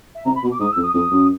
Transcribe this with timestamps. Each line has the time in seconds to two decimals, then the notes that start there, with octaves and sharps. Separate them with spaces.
0.15 E5
0.25 C3 A#5
0.35 B5
0.43 B2
0.51 D6
0.60 G#2 D#6
0.71 E6
0.76 F2
0.82 D#6
0.93 F2 D#6
1.11 F#2